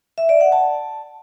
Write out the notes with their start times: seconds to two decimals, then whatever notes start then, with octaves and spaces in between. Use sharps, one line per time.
0.18 E5
0.29 D5
0.41 F#5
0.52 A5